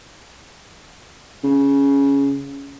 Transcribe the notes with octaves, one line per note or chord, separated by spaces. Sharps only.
C#3